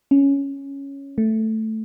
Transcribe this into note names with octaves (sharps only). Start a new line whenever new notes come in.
C#4
A3